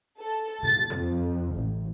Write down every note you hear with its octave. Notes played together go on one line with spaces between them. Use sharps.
A4
A6
F2
A1